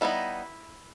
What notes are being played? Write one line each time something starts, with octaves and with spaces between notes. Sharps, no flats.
G3 B3 D#4 E4